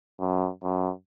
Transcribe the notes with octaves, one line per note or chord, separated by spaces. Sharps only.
F#2
F#2